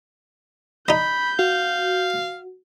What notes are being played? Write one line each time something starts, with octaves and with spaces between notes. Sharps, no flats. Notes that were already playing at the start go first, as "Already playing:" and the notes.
D#4 D#5 B5 G6
F#4 F5